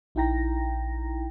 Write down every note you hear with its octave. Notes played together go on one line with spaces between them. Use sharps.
A#1 D#4 E4 G5 A#5 A#6